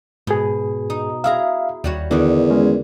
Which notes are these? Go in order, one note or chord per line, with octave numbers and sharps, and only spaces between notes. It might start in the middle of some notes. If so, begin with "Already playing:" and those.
G#2 B2 G#4
D#4
E4 G#4 E5 F5 A#5
D#2 G3 F#4 C#5
E2 D3 D#3
G#3 C#4